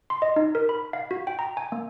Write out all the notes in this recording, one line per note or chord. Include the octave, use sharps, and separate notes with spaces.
C6
D#5
D#4
A#4
B5
F5
F#4
G5
A#5
G#5
A#3